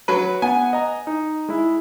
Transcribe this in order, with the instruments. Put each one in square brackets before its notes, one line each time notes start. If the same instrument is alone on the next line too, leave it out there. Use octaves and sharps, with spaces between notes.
[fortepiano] F#3 B4
[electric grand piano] B3 F#5 [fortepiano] G#5
[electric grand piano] D#5 A#5
D#4
G#3 E4